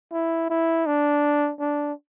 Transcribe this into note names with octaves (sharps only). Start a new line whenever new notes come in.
E4
E4
D4
D4